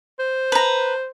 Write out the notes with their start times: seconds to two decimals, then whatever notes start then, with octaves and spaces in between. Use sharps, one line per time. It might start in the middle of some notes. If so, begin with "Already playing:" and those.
0.19 C5
0.52 B4 A#5